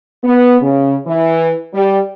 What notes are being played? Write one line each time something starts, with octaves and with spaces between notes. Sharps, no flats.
B3
C#3
E3
G3